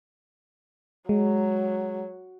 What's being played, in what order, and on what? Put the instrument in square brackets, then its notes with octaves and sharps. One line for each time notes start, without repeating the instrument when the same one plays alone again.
[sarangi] F#3 [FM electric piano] G#3